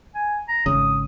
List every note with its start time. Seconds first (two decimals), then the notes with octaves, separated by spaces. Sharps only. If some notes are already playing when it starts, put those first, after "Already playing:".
0.15 G#5
0.48 A#5
0.66 G#1 C#3 D#6